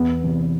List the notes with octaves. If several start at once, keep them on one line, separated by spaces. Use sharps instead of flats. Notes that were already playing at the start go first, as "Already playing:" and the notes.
Already playing: E2 B3
C3 E3